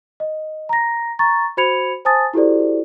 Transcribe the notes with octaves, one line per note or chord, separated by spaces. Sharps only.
D#5
A#5 A#6
A#5 C#6 A6
F#4 C5 B5 G#6 C#7 F7
C5 G#5 A5 D#6 A6
E4 F#4 G4 A4 C5 D5